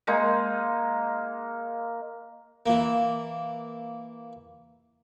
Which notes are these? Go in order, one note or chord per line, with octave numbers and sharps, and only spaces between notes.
G#3 A#3 D#4
E3 A#3